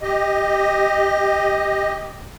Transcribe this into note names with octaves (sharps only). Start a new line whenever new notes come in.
G4 D#5